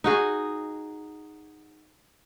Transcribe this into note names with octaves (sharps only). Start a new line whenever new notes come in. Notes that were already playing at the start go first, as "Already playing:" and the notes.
D#4 F#4 G#4